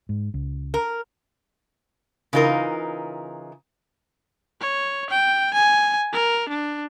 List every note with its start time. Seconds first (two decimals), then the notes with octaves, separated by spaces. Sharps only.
0.09 G#2
0.34 C#2
0.74 A#4
2.33 C#3 E3 D#4 F4 A#4
4.61 C#5
5.10 G5
5.54 G#5
6.13 A#4
6.49 D4